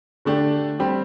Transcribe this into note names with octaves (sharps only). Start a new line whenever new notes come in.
D3 A3 D4 G4
G3 C4 G4